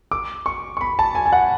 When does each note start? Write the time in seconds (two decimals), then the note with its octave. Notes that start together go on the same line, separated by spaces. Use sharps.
0.11 D6
0.46 C#6
0.77 C#6
0.81 B5
0.99 A5
1.15 G#5
1.26 G#5
1.33 F#5